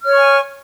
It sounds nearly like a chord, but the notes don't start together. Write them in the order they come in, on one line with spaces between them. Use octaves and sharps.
F6 C#5 C#6 G#5